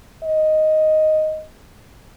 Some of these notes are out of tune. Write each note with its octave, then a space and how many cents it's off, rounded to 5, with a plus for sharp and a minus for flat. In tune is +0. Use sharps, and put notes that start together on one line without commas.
D#5 +0